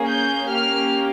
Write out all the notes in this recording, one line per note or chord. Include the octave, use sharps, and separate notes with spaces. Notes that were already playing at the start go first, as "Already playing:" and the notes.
Already playing: A#3 C#4 G#4
G6
A#3 C#4 G4 F6